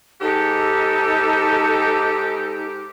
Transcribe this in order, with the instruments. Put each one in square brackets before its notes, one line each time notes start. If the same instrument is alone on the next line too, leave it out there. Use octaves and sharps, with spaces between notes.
[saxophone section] G#2 G4 [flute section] D#4 A4